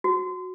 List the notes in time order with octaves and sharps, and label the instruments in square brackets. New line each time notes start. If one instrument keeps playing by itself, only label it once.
[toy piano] F#4